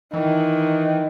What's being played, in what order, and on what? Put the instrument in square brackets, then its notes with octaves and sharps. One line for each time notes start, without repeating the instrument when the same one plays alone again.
[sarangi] D#3 [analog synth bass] E3